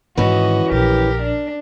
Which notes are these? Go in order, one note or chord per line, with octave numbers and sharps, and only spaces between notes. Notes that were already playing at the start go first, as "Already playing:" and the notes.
G#2 D#3 E3 C#4 F#4 D#5
A#1 G4 A#4
D4